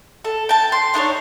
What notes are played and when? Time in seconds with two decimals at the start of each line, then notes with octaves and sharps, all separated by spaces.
0.25 A4
0.49 G5 A5
0.72 C6
0.94 D4 D#4 A4 C#5